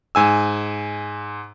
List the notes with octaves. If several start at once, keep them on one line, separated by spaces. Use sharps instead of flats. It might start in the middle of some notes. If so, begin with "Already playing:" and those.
G#2 G#5 E6